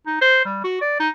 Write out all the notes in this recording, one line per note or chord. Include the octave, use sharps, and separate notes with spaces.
D#4
C5
G3
F#4
D5
D#4